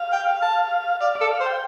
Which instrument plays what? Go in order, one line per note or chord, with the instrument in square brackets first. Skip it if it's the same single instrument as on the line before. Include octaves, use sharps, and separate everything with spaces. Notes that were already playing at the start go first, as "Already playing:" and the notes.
Already playing: [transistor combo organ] F5
[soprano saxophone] G5
A5
[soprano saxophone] D5 [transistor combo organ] F5
[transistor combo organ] D5
[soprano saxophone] A4
[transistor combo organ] F5
[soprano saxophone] C5
[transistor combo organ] G5